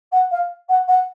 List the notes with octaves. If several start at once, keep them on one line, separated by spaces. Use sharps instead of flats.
F#5
F5
F#5
F#5